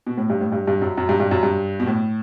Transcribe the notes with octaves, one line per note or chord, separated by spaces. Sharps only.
B2
A2
G2
A2
G2
G2
F#2
F#2
G2
G2
F#2
G2
B2
A2